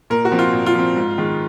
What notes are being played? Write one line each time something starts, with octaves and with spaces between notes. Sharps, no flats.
A#2 A#4
F#4
F3 C4
F4
A#2
F4
F3 C4
G#2
D#3 G#3